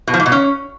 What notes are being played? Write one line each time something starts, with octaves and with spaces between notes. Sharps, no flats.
B2
F3
G#2
B2
C#4